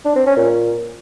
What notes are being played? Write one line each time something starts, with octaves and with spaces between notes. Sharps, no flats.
D4
C4
C#4
A#2